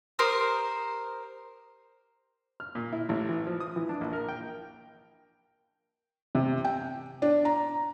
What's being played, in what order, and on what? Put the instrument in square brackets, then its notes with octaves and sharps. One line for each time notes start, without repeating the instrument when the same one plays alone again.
[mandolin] G4 A#4 C5 D#6
[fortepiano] F6
A#2
E4
A1
E3
F3
D#6
E3
D4
A#1
A#4
G5
[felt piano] C3
G5
D4
A#5